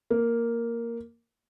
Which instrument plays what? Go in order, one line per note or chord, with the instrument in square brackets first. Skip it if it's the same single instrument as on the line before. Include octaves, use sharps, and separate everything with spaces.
[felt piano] A#3